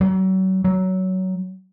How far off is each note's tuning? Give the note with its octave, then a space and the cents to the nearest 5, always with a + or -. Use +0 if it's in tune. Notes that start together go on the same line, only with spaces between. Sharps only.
F#3 +35
F#3 +15